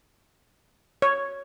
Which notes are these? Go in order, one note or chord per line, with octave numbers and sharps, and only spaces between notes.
C#5